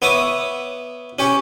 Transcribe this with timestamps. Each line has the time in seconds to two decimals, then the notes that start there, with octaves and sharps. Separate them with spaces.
0.02 B3 C#5 E5 D6 D#6
1.19 C#4 G4 C#5